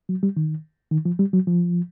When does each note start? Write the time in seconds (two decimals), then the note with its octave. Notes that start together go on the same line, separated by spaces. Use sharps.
0.09 F#3
0.23 G3
0.37 D#3
0.91 D#3
1.05 F3
1.19 G3
1.33 F#3
1.47 F3